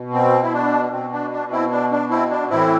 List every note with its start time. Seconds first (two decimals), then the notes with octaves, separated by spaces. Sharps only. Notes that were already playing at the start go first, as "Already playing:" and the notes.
Already playing: B2
0.13 C4
0.43 E4
0.54 D4
0.92 B2 C4
1.13 D4
1.32 D4
1.52 C4 E4
1.72 D4
1.91 D4
2.10 C4 E4
2.31 D4
2.50 A2 E3 C4 E4